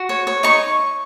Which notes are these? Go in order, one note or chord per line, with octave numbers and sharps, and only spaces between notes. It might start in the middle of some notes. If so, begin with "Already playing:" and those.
Already playing: F#4
C#5
C#5
D#4 C#6